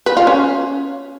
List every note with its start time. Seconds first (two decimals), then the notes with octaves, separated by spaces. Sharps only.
0.06 B4
0.17 F4
0.27 C#4